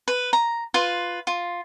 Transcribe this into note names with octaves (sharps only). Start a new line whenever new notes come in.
B4
A#5
F4 B4
F4